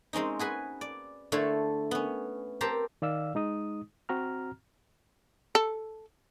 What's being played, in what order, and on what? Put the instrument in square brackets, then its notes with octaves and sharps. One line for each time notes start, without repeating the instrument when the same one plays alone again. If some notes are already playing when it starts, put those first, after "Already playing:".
[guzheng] G#3 C4 C#4 D#4
F#4 G#4 B4 G#5
D5
D3 A3 E4 A4 C5 C#5
B3 C#4
C4 G4 A#4 C5 A5 A#5
[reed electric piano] D#3 D5 F5 E6
G#3 D#4 D#6
C4 F#4 A#5 F6
[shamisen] A4